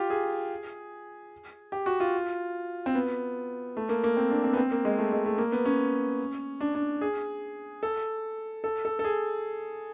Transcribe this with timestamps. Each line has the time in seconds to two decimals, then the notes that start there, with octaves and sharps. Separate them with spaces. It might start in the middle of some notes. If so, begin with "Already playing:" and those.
Already playing: F4 G4
0.10 G#4
1.72 G4
1.86 F#4
2.00 F4
2.86 C4
2.95 B3
3.77 A3
3.89 A#3
4.04 A#3
4.17 C4
4.31 D4
4.44 C4
4.53 B3
4.57 C4
4.72 A#3
4.85 G#3
4.98 A3
5.12 G#3
5.26 A3
5.38 A#3
5.52 B3
5.65 C#4
6.61 D4
6.75 D4
7.01 G#4
7.83 A4
8.64 A4
8.85 A4
8.99 A4
9.04 G#4